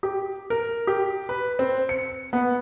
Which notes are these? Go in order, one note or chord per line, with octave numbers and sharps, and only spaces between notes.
G4
A#4
G4
B4
C4
C#7
B3